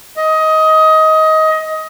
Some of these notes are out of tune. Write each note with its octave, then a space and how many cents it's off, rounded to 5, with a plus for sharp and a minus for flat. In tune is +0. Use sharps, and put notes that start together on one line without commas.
D#5 +20